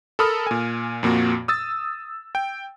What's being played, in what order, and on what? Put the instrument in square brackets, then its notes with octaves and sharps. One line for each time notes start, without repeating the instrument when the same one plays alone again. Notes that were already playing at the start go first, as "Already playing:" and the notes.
[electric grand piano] A4 A#4 B5 D#6 F6
A#2 G#5
F2 A#2 A#3 F#4
D#6 E6 A6
G5